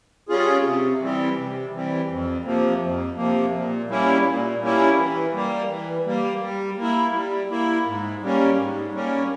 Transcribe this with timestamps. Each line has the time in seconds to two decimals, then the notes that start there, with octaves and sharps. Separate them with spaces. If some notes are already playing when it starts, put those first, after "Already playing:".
0.29 G3 C#4 F4 G#4
0.65 C3
1.00 E3 G3 C4
1.37 C3
1.73 E3 G3 C4
2.09 F2
2.45 C3 F3 A#3
2.81 F2
3.17 C3 F3 A#3
3.53 A#2
3.89 G3 A#3 C#4 E4
4.25 A#2
4.62 G3 A#3 C#4 E4
4.97 E3
5.33 G3 A#3
5.69 E3
6.05 G3 A#3
6.41 G3
6.77 A#3
6.82 E4
7.14 G3
7.50 A#3 E4
7.86 G#2
8.22 G3 A#3 C#4
8.58 G#2
8.93 G3 A#3 C#4